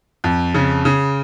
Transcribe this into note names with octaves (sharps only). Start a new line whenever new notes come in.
F2
C#3
C#3